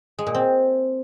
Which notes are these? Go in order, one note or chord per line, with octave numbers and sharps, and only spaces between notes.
G#3
A#2
C4